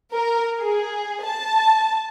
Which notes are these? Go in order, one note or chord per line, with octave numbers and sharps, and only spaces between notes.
A#4
G#4
A5